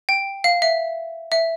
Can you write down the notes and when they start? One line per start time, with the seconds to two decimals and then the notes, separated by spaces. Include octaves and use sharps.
0.09 G5
0.44 F5
0.62 E5
1.32 E5